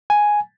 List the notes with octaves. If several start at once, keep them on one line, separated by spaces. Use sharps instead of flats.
G#5